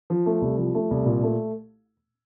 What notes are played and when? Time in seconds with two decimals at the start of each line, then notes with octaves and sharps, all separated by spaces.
0.10 F3
0.26 A3
0.41 C2
0.57 F3
0.75 A3
0.91 C2
1.06 A#2
1.23 A3